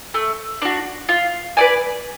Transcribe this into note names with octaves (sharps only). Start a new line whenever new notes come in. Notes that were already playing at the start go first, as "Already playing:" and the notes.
A3
D4 F#4
F4
B4 D5 G#5